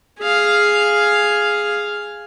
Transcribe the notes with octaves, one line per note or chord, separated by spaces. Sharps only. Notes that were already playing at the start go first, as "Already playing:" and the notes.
G#4 F5